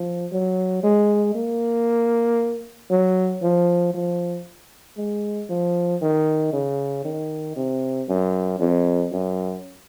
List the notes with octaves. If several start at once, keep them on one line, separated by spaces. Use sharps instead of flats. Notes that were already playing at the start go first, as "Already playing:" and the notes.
Already playing: F3
F#3
G#3
A#3
F#3
F3
F3
G#3
F3
D#3
C#3
D#3
C3
F#2
F2
F#2